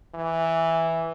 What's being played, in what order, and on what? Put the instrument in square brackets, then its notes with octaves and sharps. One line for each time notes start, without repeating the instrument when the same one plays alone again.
[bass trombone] E3